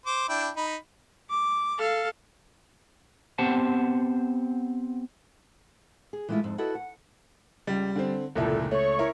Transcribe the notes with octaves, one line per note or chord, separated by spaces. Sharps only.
C5 D6
D4 E4 G5
D#4 B5
D6
A4 F5
B3 C4 G4 C5 F#5 A5
G#4
E3 G#3 A3 B3 E4 F4
F2 G#2
E4 F#4 A4 B4 D#5
F#5
C#2 G3
D3 C4
F1 C#2 A#2 E4 A4
A3 C#5 C#6
E4 A#4